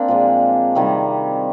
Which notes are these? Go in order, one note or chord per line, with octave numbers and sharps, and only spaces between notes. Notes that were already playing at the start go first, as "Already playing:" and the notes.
Already playing: A#3 C4 D4
A#2 F3 G#3
C3 D#3 G3